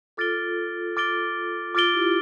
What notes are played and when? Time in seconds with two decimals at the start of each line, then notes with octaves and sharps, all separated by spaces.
0.17 F4 A4 D6 F6 A6 D7 G7
0.97 D6 F6 A6 D7 G7
1.75 F4 D6 F6 A6 D7 G7
1.94 E4 G4